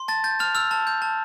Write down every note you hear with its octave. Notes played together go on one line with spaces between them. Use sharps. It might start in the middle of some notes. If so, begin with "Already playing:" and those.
Already playing: C6
A5 A6
G6 A6
A5 F6 F7
E6 F6 F7
A5
G6
A5